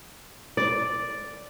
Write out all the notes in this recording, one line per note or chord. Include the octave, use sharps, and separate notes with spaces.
D5